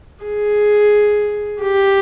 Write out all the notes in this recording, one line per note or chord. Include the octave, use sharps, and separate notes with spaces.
G#4
G4